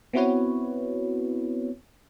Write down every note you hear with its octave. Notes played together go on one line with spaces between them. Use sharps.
B3 C4 E4 F#4 B4 C#5